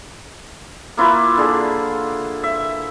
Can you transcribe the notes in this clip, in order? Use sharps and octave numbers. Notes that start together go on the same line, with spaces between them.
A#3 E4 F4 B4
D3 G#4
E5